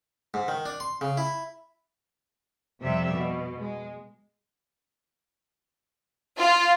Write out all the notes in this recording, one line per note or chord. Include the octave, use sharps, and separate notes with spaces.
G#2
D#3
D4
C6
C#3
E4
F2 C3 G3 E5
B2
G#3
F4